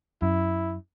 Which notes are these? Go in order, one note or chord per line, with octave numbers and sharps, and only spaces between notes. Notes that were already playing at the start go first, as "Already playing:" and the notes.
F#2 E4